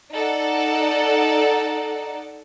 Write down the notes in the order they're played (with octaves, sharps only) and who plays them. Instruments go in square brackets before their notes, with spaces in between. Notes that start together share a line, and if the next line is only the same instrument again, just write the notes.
[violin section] D#4 A4 D5 F#5